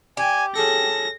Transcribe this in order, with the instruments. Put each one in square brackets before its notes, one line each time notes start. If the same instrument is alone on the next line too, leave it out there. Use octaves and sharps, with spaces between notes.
[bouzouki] G4 [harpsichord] D5 [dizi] G#5
[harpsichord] C#4 G#4 A4 [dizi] A5 [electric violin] A#6